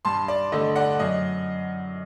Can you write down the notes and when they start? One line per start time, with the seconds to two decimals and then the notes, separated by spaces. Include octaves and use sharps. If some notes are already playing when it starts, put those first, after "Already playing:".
0.05 G2 A5 C6
0.28 D5
0.52 D3 A3 D#5
0.76 D5 F#5
0.99 F#2 D#5